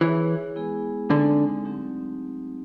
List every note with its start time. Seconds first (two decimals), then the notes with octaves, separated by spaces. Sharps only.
0.01 E3 E4 G#4 C#5
0.56 G#3 B3 E4 G#4
1.10 D3 G#3 C4 D#4
1.65 F#3 A3 C4 D#4 G4